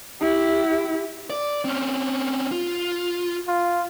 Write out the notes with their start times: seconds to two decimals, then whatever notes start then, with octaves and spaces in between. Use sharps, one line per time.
0.21 E4 G4
1.30 D5
1.65 C4 C#4
2.51 F4
3.48 F4